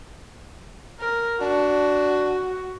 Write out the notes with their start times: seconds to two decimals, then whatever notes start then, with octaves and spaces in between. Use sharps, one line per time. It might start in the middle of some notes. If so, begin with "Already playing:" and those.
1.01 A#4
1.41 D4 F#4